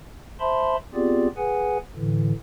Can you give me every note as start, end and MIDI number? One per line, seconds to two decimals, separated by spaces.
0.40 0.76 72
0.40 0.76 76
0.40 0.76 81
0.40 0.76 83
0.40 0.76 84
0.94 1.27 59
0.94 1.27 60
0.94 1.27 65
0.94 1.27 67
0.94 1.27 68
0.94 1.27 74
1.37 1.78 68
1.37 1.78 71
1.37 1.78 78
1.37 1.78 80
1.96 2.32 45
1.96 2.32 50
1.96 2.32 52